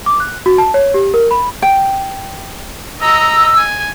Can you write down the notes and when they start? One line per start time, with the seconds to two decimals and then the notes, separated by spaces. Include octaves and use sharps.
0.06 D6
0.20 F#6
0.46 F#4
0.58 A5
0.74 C#5
0.94 G4
1.14 A#4
1.31 B5
1.62 G5
3.01 D#5 A#5 E6
3.57 G#5